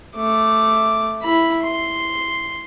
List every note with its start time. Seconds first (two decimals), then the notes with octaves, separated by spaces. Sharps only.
0.16 A3 D6
1.22 E4 B5
1.63 C6